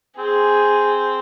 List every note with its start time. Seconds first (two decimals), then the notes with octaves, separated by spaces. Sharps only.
0.18 C4 G#4